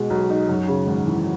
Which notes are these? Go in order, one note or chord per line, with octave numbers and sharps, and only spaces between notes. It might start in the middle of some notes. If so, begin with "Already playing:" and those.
Already playing: B2 G#3
B1
D#4
F#2
C#3
G#1
E3